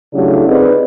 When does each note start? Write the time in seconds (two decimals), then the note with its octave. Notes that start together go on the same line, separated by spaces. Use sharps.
0.14 C#3 F#3 A3 D4 E4 G4
0.48 C4 D#4 F4 G#4 B4 D5